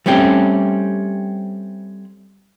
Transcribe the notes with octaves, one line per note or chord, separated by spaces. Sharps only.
G3 A3 C4 C#4 G4